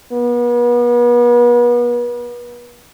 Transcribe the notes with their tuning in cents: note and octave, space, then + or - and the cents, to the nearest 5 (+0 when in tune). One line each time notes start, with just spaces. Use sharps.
B3 -35